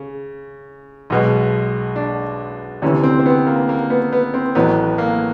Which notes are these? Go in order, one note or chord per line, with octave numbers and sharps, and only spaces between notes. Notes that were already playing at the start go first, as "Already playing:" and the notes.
Already playing: C#3
B1 B2 G#3
D4
D2 C3 E3 C#4
C4
C4
B3
A#3
A#3
B3
B3
C4
A1 A2 F#3 B3
A#3